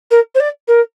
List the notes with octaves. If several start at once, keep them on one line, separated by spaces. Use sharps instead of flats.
A#4
C5
D5
A#4